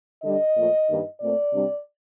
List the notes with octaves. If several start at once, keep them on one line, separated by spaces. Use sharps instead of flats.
D3 G3 D4 D#5
A#2 F3 A3
G2 D#3 G3 A#3 D#4
A#2 A3 C4 D5
C3 G3 D4